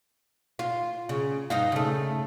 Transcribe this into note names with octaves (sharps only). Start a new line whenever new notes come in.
F4
C#3
G2 D#4 F5
C#3 A3